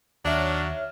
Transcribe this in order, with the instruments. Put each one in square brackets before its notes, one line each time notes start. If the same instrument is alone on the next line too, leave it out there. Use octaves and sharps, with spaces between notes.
[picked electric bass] D#2 [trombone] F#3 [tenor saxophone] D4 [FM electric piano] C#5 E5 F6